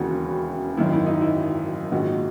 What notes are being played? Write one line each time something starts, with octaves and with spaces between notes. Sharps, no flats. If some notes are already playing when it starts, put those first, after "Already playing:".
Already playing: E1 D#2 C#3 E3 F#4
G#1 F#2 D#3 E4
E4
D#4
E4
A#1 G#2 D#3 F#4